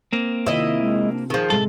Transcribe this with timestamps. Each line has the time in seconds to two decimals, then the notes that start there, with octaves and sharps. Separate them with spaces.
0.13 A#3 C4
0.46 C3 D#3 E4 F4 D#5
0.80 G#3
1.12 D4
1.30 D#3 F3 G#4
1.50 A2 C3 G#3 A4